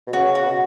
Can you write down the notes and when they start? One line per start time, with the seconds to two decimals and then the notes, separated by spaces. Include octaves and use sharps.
0.07 B2
0.12 C#3 F#4
0.35 F#4
0.45 B2